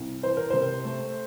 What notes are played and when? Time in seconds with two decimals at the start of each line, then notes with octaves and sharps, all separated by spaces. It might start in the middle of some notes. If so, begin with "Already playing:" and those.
Already playing: C2
0.23 E3 C5
0.37 A#4
0.50 C3 C5
0.85 A3